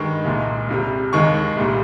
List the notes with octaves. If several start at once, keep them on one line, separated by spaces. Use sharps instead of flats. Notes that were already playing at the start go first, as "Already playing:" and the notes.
Already playing: G2 D#3 G#3 C#6
C2 A#2 G#3
C2 C3 G3
D#2 D#3 G#3 C#6
C2 A#2 G3